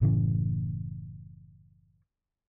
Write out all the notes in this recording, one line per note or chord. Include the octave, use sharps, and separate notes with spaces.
F#1 A2 C#3 E3